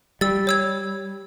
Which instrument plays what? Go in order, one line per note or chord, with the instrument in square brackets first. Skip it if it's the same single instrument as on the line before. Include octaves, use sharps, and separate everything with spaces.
[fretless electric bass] G3 [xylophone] E6 A6
[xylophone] C#5 E6 G#6